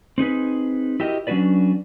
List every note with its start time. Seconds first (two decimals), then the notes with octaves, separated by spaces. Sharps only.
0.18 C4 D#4 G#4 B4
1.00 E4 F#4 G4 A#4 D#5
1.27 F#3 C#4 D4 F#4 B4 D5